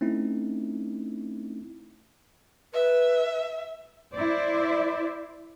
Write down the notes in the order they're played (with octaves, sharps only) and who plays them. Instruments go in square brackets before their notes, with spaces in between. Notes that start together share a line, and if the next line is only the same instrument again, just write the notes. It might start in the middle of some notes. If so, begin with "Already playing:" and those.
[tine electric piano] A3 C4 C#4 D#4 E4
[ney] B4 [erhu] E5
[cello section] E4 C5 D5